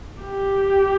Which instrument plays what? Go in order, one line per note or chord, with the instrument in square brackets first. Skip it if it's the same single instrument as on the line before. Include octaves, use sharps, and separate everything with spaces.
[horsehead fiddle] G4